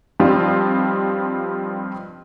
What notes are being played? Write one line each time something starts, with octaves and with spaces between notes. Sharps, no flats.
G2 F3 G3 C4 D#4 F4